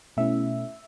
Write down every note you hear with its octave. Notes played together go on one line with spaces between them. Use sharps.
B2 A3 C#4 E4 E5